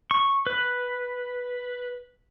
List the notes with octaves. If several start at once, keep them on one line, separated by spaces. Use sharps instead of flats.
C#6
B4